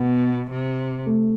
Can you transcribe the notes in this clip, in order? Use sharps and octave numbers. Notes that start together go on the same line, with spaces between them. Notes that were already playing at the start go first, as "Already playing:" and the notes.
Already playing: B2 B3
C3
A3